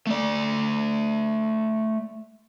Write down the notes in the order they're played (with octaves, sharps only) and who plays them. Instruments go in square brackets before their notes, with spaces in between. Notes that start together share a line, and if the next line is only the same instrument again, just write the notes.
[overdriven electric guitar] A3 D5